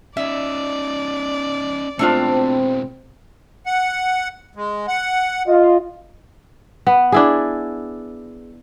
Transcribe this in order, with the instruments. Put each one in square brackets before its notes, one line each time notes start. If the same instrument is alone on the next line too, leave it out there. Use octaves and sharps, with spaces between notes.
[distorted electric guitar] C#4 D#4 [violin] D5 [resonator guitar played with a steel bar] E5
[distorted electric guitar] B2 G#3 [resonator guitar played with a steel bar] A3 D4 F4 [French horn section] C4
[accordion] F#5
G#3
F#5
[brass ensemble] F4 D#5
[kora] B3
D4 E4 G#4